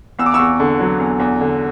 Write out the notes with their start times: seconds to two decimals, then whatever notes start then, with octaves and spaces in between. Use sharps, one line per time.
0.19 E2 E6
0.26 D6
0.34 C#6 E6
0.39 E2
0.60 D3
0.80 F#3
1.00 E2
1.20 E2
1.41 D3